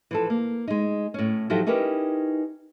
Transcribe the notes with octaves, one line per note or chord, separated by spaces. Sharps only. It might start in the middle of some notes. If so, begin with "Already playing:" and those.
E3 F3 A4
A#3
G#3 D#4
A2 C#4
F3 F#3 D#4 E4 G4 A4
C#4 D#4 E4 G4 A#4 B4